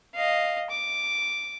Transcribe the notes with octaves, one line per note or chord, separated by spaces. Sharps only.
D#5 F5
D6